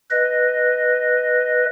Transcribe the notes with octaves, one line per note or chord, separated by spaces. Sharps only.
B4 D#5